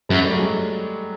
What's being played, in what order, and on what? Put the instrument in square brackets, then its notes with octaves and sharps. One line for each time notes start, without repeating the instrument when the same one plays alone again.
[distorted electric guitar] F#2 [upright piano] F#3 G#3
[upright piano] G3 A3
F#3 G#3